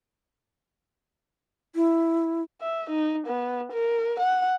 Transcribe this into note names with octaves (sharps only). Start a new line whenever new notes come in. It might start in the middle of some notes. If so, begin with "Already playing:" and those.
E4
E5
D#4
B3
A#4
F#5